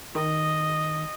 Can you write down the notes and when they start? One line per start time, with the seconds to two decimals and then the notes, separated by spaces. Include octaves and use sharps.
0.15 D#3 D#5